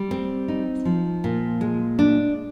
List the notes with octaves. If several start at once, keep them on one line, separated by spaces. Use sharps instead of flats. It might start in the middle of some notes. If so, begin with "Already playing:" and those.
Already playing: G3
C4
D#4
F3
A#2
G#3
D4